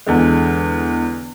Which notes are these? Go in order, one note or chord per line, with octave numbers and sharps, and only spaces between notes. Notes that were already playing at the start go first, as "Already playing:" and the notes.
E2 D3 G#3